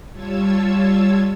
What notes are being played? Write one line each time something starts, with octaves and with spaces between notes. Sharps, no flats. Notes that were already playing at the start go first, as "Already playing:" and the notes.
G3 F4 C#5 A5 E6 G#6